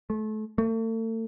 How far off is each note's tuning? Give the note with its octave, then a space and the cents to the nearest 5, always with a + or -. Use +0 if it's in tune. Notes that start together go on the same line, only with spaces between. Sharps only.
A3 -30
A3 +40